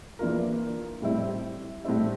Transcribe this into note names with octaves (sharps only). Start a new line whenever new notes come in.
E3 A#3 D4 F4 A#4
A2 G3 C4 E4
A2 G3 C4 E4